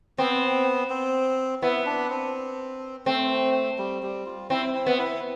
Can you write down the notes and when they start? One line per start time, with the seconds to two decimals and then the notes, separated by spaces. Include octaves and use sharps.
0.18 B3 C4
0.90 C4
1.62 B3 E4
1.86 D4
2.10 C4
3.06 A3 C4
3.78 G3
4.03 G3
4.26 F4
4.50 C4 E4
4.74 E4
4.86 B3
4.98 E4